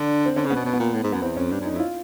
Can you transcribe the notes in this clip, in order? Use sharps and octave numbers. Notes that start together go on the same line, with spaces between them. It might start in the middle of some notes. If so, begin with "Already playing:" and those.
Already playing: D3 D4
C4
D3 C#4
C#3
B2 B3
B2
B3
A#2
A2
G#2
F#2 B3
E2 C4
F2 C#4
G2 D4
F#2
F2 D#4
E4
F4